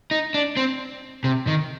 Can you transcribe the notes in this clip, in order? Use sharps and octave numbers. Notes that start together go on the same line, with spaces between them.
D#4
D4
C4
C3
D#3